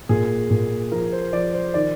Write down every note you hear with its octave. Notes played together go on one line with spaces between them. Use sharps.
A#2 G#4
A#2
F3 A#4
C5
F3 D5
C5
D#3 D5